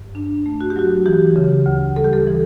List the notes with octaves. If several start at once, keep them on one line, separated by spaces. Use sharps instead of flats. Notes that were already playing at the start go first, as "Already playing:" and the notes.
Already playing: G2
D4
A3
F#4
G4
F#3 F#4
E3 G4
C#3
D2
G3 A4
G4
A4
E3